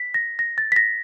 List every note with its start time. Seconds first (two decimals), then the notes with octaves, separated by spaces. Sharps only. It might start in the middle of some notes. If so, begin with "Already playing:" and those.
Already playing: B6
0.14 A#6
0.39 A#6
0.58 A6
0.72 B6
0.76 A#6